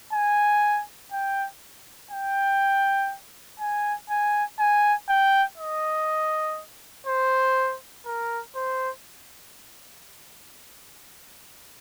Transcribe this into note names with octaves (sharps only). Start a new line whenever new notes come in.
G#5
G5
G5
G#5
G#5
G#5
G5
D#5
C5
A#4
C5